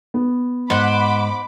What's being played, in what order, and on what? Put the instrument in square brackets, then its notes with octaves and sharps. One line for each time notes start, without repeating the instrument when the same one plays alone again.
[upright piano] B3
[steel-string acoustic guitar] G#2 [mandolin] C5 F#5 [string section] B5 D6